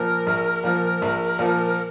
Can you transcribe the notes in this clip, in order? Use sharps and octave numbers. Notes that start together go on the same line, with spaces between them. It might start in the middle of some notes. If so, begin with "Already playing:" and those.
Already playing: A#2 F3 A#4
A#1
A#2 F3
A#1
A#2 F3